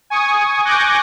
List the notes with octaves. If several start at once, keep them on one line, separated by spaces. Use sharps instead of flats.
G#5 C#6 D#6
G#5 C#6 D6 F#6 G6 A#6